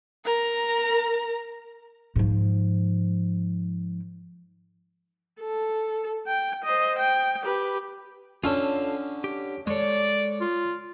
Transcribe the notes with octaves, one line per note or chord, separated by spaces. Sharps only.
A#4 A#5
G#2 F3
A4
G5
C5 D#5
G5
G4 B4
D3 C#4 F4 A4
G4
G#3 A4 C#5 D5
F4